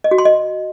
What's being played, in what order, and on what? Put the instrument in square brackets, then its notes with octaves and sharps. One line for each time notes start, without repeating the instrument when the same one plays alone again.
[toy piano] D#5
F#4
C6
D#5